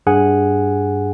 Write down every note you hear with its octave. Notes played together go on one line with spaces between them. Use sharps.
G2 G#4 F#5 G#5